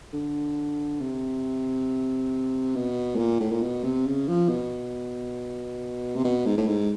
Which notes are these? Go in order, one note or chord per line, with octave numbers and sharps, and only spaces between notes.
D3
C3
B2
A2
A#2
A2
A#2
B2
C3
C#3
F3
B2
C3
B2
G#2
A2
G#2